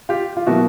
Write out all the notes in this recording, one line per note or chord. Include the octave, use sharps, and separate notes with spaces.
F4 G4
F4
B2 F#3 A#3 E4 F#4